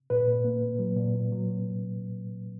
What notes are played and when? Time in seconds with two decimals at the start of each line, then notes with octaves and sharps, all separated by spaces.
0.10 A#2 B4
0.28 A#2
0.44 A#3
0.62 A#2
0.79 F#3
0.97 A#2
1.14 A#2
1.32 F#3